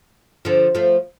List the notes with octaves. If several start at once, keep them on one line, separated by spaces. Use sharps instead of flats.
D3 F3
F3 A3